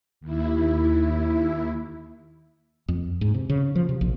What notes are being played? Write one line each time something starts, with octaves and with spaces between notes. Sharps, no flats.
D#2 E4
F2
G#2
C3
C#3
F3
C3
A#1